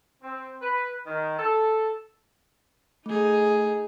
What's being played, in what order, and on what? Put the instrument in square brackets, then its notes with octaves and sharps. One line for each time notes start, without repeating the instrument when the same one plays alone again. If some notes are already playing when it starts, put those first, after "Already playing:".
[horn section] C4
B4
D#3
A4
[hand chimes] A3 [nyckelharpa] D#4 G#4